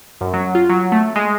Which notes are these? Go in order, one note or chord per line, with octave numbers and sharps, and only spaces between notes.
F#2
F#3
F4
F#3
A3
G#3